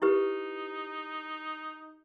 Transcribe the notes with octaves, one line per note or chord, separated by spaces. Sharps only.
D#4 E4 G4 B4